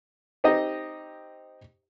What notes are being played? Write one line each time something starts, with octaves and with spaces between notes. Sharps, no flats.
C4 D#4 G4 D#5